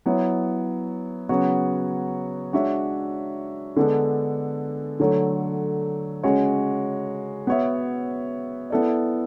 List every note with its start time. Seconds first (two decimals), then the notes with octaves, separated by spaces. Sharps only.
0.06 F#3 B3 E4
1.29 C#3 F#3 B3 F#4 C#5
2.53 G#3 D4 F#4 C#5 E5
3.76 D3 G#3 B3 D4 A4
5.00 D3 F#3 A3
6.23 C#3 G#3 C#4 F#4 C#5
7.47 B3 F#4 C#5 E5
8.70 B3 E4 A4 D5